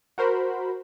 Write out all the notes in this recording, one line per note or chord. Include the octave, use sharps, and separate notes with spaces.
F#4 A#4 C5 B5